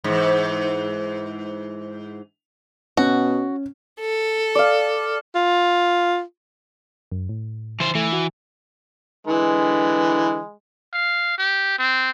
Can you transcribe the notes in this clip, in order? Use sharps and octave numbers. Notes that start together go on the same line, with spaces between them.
G#2 E3
B2 C#4 F#4
A4
D5 F5
F4
F#2
A2
E3 C5 A6
E3 A3
F#4
D3 E3 G#3 B4
F5
G4
C4